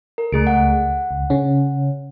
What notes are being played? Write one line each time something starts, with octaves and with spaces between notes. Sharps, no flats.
A#4
C#2 A3 G#4 D7
F#5
C#2
C#3 C#4